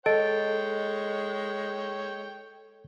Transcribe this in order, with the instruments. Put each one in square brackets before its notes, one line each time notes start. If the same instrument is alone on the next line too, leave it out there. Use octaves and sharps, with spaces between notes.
[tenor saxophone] G#3 [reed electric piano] A4 [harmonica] C#5 G5 [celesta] D#5 A6 D7